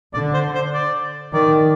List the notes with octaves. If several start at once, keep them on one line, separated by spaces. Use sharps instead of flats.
D3 D5
C5
C5
D5
D#3 D5